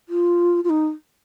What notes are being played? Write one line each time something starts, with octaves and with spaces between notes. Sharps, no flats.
F4
F4
D#4